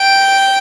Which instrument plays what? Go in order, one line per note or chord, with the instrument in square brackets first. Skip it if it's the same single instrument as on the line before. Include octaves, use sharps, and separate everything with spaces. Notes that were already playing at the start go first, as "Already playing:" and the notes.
Already playing: [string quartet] G5